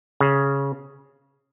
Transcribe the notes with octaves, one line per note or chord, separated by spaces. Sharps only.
C#3